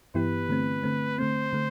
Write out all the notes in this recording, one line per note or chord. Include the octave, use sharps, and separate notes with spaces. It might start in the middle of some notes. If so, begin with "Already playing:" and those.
G2 E3 B3 E4 G4 B4
D3 A3 C4
D3 A3 C4
D3 A3 C4 C5
D3 A3